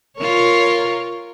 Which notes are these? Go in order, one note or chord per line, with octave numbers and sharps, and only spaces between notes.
F4 A#4 C#5